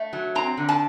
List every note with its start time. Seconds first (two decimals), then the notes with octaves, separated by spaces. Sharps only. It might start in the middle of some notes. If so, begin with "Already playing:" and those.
Already playing: A3
0.13 F#3
0.35 C4 A#5
0.57 D3
0.69 A5